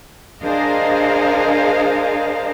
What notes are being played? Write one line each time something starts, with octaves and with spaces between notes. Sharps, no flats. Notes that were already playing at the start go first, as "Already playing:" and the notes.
D4 G#4 A#4 C5 D#5 F5